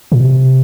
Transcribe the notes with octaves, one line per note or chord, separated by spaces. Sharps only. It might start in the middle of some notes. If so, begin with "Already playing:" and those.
A#2
C3